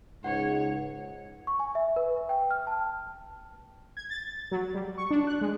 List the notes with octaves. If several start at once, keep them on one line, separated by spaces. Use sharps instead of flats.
C#2 G#2 C#5 F#5
C#6
G#5
E5
B4
G5
F6
A5
G#6
A6
F#3
G3
C#6
D4
F#6
G#3